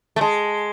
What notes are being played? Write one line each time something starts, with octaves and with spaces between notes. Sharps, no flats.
A3
G#3